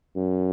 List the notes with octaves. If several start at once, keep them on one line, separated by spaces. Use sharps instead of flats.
F#2